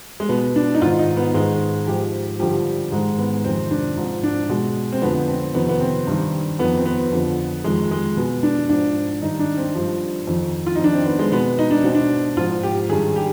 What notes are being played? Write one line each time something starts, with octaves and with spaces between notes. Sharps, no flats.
G#3
B2 B3
D4
D#4
G#2 D#3 F4
D#4
B3
G#2 D#3 G#3
G#2 F3 G4
G2 D3 F3 G4
G#2 D#3 G#3
B3
F2 C3 D#3 C4
D4
G#2 F3
D4
B2 G#3
C4
F2 D3 F3 B3
C4
F2 C3 D#3 B3
B3
C4
G2 D#3
F2 D#3 B3
C4
B3
F2 D3 F3
F2 D#3 G#3
G#3
B2 B3
D4
G#2 F3 D4
G2 D#3 D#4
D4
C4
G2 F3
F2 D#3
F4
D#4
F2 D#3 D4
C4
B3
G#3
B2 B3
D#4
D4
B2 C4
D4
G#2 F3 F4
G4
G2 D#3 G#4
G4